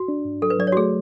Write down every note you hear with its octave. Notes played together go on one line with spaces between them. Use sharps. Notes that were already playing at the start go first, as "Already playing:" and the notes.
Already playing: F#4
D4
G#2
F#3 A4
B4
F#3 D5
C#5
F#4
A3 G#4